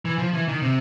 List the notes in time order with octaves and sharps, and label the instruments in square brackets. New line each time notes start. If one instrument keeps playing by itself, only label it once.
[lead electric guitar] E3
F3
E3
D#3
C3